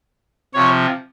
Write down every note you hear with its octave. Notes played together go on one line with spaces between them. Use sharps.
C3 F3 C#5